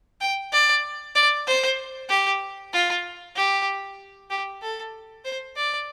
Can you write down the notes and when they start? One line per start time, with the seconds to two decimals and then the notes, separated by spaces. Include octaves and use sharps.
0.21 G5
0.52 D5
1.15 D5
1.47 C5
2.09 G4
2.73 F4
3.36 G4
4.30 G4
4.62 A4
5.25 C5
5.56 D5